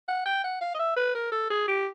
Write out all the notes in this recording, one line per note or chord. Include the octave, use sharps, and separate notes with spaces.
F#5
G5
F#5
F5
D#5
E5
B4
A#4
A4
G#4
G4